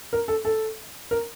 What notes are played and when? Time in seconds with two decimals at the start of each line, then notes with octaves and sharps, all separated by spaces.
0.13 A#4
0.28 A4
0.45 A4
1.11 A#4